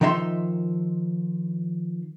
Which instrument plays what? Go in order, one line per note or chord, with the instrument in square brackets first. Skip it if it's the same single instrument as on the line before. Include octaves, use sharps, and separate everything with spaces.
[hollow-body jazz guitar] D#3 F3 D#4 E5 G5 C6